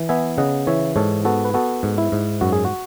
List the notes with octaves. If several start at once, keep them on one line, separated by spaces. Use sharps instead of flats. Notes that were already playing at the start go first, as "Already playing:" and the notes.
Already playing: E3
B3 E5 G#5
C#3 D#5 F#5
E3 C#5 E5
G#2 A4 C#5
B3 F#4 A4
B4
B3 F#4 A4
G#2
E4
G#2
F#2 F#4
G#4
F#4